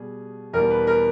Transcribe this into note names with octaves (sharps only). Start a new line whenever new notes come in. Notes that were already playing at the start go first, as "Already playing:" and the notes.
Already playing: B2 G3 G#4
E2 B2 G3 A#4
B4
A#4